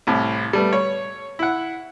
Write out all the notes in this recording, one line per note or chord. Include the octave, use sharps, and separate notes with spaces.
C2 A2
G3 A3 B3
C#5
E4 F#5